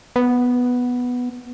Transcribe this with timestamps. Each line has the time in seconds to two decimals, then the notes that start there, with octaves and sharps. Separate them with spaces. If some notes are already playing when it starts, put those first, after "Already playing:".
0.16 B3